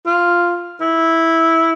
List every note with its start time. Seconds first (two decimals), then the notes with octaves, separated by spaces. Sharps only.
0.06 F4
0.81 E4